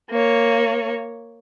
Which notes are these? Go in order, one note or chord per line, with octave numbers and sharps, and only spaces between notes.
A#3 C#5